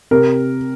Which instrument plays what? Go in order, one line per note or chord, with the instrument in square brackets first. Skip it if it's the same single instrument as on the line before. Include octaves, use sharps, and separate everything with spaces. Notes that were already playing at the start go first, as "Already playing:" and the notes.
[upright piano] C3 A#4